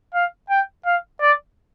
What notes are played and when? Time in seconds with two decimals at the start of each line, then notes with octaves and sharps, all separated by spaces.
0.14 F5
0.50 G5
0.86 F5
1.21 D5